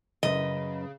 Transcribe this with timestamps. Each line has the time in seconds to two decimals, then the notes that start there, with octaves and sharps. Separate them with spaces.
0.23 F#2 C#3 B4 D#5